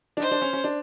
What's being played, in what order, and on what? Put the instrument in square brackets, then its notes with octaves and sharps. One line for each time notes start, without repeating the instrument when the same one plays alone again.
[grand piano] D4
[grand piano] D#4 [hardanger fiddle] C5
[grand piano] D4
C#4
C#4
D4